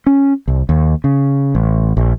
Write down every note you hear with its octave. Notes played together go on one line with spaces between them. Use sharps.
C#4
C2
D#2
C#3
A1
A#1